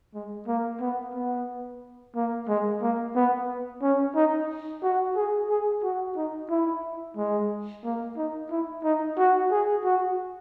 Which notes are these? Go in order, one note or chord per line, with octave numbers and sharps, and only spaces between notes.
G#3
A#3
B3
B3
A#3
G#3
A#3
B3
C#4
D#4
F#4
G#4
G#4
F#4
D#4
E4
G#3
A#3
D#4
E4
D#4
F#4
G#4
F#4